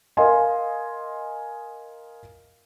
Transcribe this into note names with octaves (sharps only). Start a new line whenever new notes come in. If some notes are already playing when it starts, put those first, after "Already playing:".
A#4 D#5 F5 G#5 C6